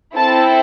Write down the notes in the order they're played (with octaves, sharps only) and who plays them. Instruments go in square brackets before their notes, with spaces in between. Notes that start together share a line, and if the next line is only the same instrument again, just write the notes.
[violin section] C4 E4 A4 A5